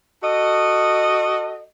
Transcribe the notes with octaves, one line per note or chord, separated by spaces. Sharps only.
F#4 A4 D#5